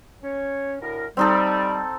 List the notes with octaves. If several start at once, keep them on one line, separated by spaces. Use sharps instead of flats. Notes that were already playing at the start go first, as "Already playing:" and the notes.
C#4 C#5
D2 A2 A#4
G3 C4 D#4 A4